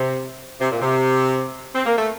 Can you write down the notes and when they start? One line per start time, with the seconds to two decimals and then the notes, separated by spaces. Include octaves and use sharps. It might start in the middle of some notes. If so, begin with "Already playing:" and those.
Already playing: C3
0.60 C3
0.71 A#2
0.82 C3
1.75 C4
1.86 A#3
1.97 A3